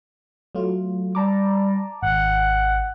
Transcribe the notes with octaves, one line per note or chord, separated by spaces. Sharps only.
F#3 A3 F4
G3 A5 A#5 D6
G#1 F#5